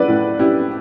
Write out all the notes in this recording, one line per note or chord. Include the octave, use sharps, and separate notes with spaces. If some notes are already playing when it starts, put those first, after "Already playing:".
Already playing: E4 B4 D5 F#5
A2
E4 G4